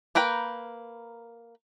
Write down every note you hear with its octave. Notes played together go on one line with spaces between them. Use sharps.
A#3 A#4 B4 G5